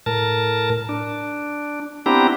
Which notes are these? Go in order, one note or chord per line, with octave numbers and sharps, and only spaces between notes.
A2 A#4 A5
D4
B3 C4 D4 E4 G4 A#5